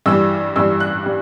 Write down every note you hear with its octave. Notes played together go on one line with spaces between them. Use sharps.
G2 E3 G3 E6
G2 E3 G3 E6
F#6
G3